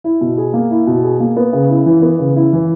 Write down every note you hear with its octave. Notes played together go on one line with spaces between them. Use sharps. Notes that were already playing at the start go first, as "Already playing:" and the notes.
E4
B2
G#4
A#3
E4
B2
G#4
A#3
B3
C#3
E4
E3
B3
C#3
E4
E3